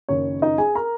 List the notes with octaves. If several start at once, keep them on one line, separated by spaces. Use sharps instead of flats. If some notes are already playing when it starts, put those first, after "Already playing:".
F#1 F#2 D#3 C#5
D#4 D#5
G#4 G#5
A#4 A#5